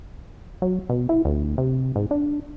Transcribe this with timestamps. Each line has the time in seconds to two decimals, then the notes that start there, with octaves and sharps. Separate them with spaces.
0.62 F#3
0.90 B2
1.09 E4
1.25 D2
1.58 C3
1.96 G#2
2.11 D4